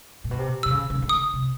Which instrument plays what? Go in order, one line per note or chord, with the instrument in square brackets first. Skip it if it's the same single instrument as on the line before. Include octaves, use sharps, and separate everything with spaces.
[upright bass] A#2
B2
C3
[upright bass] C3 [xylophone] E6
[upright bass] C#3
C#3
D3
[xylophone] D#6
[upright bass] C3